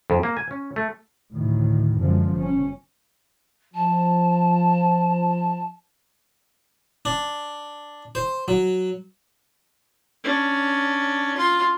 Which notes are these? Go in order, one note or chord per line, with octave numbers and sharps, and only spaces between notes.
F2
A#3
G#5
C#4
A3
D2 A2 D#3
F#2 D3 F3 G#3
G1 C#4
F3 A5
D4
C5
F#3
C#4 D4
F4 C6